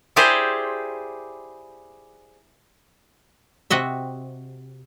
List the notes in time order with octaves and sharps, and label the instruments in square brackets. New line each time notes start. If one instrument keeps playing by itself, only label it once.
[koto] E4 G4 G#4 C5 D5
C3 F#4 D#5 E5